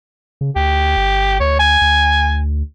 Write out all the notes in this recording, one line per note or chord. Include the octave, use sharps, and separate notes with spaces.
C#3
D2 G4
G1
D2 C#5
G#5
D2